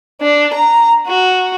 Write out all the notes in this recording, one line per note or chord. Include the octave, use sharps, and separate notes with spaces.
D4
A#5
F#4